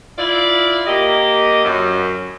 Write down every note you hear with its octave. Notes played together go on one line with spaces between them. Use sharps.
E4 F4 D5
A#3 G4 D#5
F#2